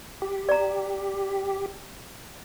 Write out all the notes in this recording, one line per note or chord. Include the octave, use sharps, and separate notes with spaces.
G4
D5 A#5